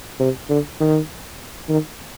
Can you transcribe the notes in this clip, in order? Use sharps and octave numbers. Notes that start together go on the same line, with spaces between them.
C3
D3
D#3
D#3